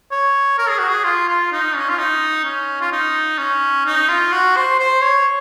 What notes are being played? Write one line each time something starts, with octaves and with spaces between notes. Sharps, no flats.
C#5
A#4
G#4
F#4
G#4
F4
F4
D#4
C#4
F4
D#4
C#4
F4
D#4
C#4
D#4
F4
F#4
C5
C5
C#5